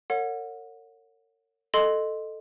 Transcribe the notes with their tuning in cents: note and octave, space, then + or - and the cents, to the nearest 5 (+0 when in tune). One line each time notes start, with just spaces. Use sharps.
A#4 -40 C#5 +10 F#5 -25
A4 +0 D#5 -10 C6 +0